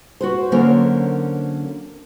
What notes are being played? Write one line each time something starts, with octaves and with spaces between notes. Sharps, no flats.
F#4 B4 C5
D3 F#3 A#3 C#4 A#4 C5